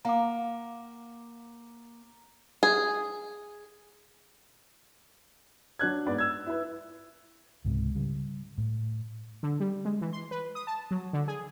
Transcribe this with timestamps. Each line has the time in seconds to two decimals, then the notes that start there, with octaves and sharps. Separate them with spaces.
0.05 A#3 F5 F#5 A#5 D6
2.63 G#4
5.79 F#3 D4 F#6 G#6
6.06 G#2 B3 B4 D5
6.18 E6 G#6
6.46 E4 B4
7.65 C#2 G#2 C3
7.95 C#3 G3
8.58 A2
9.43 D3
9.60 G3
9.85 G#3
10.01 E3
10.13 C6
10.31 B4
10.55 D#6
10.67 A5
10.91 F#3
11.13 D3
11.28 G#4